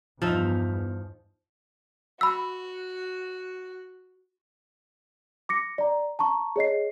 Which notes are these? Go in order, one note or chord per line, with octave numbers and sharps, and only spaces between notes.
E2 G2 F3 D#4 E5
F#4 B5 E6
D6 A#6 C#7
D5 A#5
A5 A#5 C#6
G#4 C#5 D#5 C7